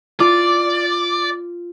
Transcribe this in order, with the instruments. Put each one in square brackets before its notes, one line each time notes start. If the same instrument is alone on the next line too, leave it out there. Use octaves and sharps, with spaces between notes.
[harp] F4 D6 [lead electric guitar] D5